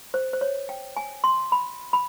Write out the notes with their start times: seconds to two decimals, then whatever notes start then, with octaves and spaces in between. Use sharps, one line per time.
0.14 C5
0.33 C5
0.41 C#5
0.69 G5
0.97 G#5
1.24 C6
1.52 B5
1.93 B5